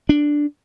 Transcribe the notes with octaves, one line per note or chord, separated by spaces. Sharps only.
D4